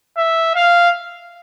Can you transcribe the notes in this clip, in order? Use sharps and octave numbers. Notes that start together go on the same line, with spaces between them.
E5
F5